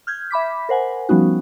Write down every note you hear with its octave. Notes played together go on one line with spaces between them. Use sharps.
F6 G6 G#6
E5 B5 D6 B6
A#4 C5 F#5 G#5
F3 G3 B3 C#4 D#4 F#4